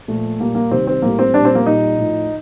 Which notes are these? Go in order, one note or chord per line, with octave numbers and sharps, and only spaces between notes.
A#2 F3 A3
A#2 G3 A#3
A#3
C3 D#3 G3 C4
C4
A2 G3 A#3
C4
A#2 G3 D4
C4
A#3
A#2 G3 D#4
A2 F3